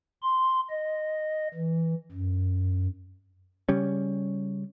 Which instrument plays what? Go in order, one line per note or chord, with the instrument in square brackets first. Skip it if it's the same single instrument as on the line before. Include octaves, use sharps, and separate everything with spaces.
[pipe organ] C6
D#5
E3
F#2
[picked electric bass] C#3 G3 C#4